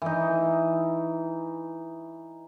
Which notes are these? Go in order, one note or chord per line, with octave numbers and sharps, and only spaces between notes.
E3 D#4